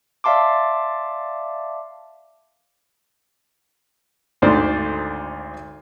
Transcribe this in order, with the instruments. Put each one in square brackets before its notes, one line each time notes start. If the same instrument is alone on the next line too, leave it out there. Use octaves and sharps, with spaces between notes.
[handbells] D5 E5 F5 A5 C6 D6
[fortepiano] G#1 D2 D3 C5 D5